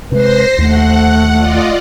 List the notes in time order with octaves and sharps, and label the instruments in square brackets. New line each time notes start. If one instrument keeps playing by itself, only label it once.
[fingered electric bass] C3 G#3 [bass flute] B4 [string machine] C5 C6 A#6
[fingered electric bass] D#2 [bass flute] A3 [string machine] F#5
[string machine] F4 D5 D#5